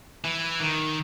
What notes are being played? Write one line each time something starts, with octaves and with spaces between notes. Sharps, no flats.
E3
D#3